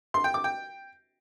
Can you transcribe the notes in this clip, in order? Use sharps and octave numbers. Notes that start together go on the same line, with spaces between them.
C6
G5
D6
G5